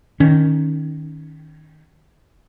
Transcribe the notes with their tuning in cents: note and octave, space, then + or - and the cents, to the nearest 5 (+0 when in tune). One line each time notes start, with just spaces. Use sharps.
D#3 +0 C#4 +0